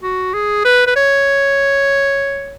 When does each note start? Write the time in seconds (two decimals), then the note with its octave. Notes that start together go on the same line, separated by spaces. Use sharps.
0.03 F#4
0.34 G#4
0.65 B4
0.87 B4
0.96 C#5